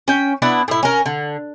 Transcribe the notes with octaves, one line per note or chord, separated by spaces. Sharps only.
C#4 G5
B3 D4 E4 F#5
A2 E4
C#4 A#4
D3